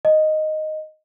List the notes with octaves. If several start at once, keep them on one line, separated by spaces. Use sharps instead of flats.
D#5